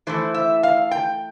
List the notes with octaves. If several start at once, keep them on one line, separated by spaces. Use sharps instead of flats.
E3 A3 E4 C5
E5
F5
G5